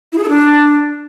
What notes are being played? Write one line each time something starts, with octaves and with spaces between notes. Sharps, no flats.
E4
G#4
A4
D4